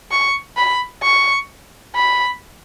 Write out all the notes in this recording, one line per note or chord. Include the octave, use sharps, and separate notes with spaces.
C#6
B5
C#6
B5